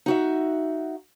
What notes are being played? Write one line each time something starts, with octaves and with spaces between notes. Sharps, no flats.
D#4 F#4 E5